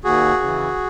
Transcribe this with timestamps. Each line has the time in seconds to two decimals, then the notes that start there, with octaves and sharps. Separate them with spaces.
0.04 D#2 F#4 G#4
0.40 C#3 E3